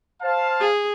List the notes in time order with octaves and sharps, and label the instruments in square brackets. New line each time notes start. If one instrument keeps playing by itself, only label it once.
[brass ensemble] C5 F5 A5
[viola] G#4